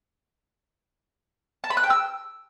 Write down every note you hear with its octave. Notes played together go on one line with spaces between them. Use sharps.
A5
B5
F#6
G5
E6